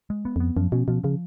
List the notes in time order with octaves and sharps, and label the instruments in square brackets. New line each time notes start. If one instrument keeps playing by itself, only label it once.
[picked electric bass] G#3
B3
[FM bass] F2 [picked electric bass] B3
[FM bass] F#2 [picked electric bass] F3
[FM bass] B2 [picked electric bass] C#4
[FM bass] B2 [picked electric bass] F3
[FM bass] C#3 [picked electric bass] F3